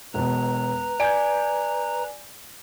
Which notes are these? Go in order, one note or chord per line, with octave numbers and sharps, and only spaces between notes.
E1 B2 B4 A#5
D5 G#5 G6 G#6 D7